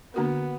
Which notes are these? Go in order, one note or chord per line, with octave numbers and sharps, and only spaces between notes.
D3 A#3 B3 D4 F#4 A#4